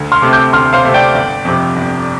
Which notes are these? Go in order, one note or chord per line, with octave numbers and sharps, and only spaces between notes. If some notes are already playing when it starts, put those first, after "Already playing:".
Already playing: D2
C6 F6
C3 A3 C4
D6 G6
D2 C6 F6
C5 F5
C3 A3 C4
D5 G5
G1
F2 C3
G1